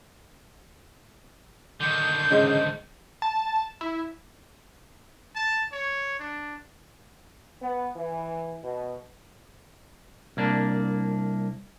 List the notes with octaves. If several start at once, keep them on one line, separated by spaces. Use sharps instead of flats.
D3 D#3 G6
G#2 C#3 D#4
A5
E4
A5
C#5
D4
B3
E3
B2
C2 A#3 D4